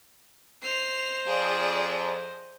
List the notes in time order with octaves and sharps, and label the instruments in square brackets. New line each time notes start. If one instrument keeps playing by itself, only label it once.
[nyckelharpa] C5 D#5 [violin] C7 F7
[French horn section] F2 F3 [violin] G#4 D5